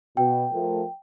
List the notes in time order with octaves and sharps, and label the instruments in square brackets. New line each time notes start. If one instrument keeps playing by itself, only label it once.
[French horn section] B2 [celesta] G5
[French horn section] F3 A3 A#4